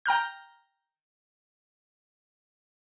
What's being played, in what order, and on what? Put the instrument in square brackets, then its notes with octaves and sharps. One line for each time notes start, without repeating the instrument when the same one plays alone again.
[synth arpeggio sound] G5 A#5 F6 G6